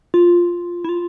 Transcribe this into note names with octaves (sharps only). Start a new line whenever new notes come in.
F4
E4
F4